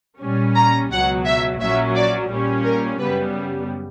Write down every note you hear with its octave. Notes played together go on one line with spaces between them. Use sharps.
A#2 G3 C#4
A#5
C#2 B2 F#3 F#5
E5
A#1 A#2 F#3 C#4 E5
D5
A#2 G3 C#4
A#4
F#2 C#3 G3 B3 B4